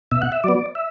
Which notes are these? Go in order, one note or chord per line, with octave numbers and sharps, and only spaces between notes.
B2 E5
F#5
E5
F#3 B3 D5
E5